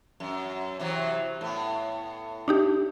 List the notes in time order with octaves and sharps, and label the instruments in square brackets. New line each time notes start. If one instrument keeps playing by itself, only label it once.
[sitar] F#2
C3 E3 F#3
A2 B3
[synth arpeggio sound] D4 D#4 G4